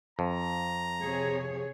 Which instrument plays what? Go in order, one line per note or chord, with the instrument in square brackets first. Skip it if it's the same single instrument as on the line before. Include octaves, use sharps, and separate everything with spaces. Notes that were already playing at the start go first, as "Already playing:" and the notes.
[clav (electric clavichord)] F2 [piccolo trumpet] A#5
[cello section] C3 G#4 C#5